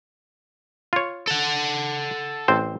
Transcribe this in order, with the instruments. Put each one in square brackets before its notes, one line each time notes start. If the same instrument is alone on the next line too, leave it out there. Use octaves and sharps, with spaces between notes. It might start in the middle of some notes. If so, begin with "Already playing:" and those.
[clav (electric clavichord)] F4 C#5
[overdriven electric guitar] A4 F#5
[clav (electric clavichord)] A1 C4 C5